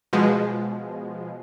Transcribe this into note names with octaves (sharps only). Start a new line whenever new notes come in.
B2 F3 G#3